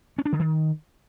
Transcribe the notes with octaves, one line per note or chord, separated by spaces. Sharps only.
C#4
D4
D3
D#3